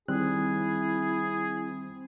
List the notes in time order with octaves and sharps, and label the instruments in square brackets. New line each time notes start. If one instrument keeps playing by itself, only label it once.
[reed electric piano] D#3 G3 F#6 [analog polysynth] C4 [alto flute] E4 [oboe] G#4